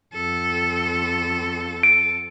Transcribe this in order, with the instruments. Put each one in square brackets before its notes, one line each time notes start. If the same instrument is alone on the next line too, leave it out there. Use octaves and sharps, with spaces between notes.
[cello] F2 A4
[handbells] D7